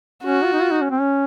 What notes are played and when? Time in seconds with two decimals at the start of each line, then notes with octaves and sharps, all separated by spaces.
0.24 C#4 F#4
0.44 F4
0.53 D#4
0.62 F4
0.71 D#4
0.81 C#4
0.90 C4
1.00 C#4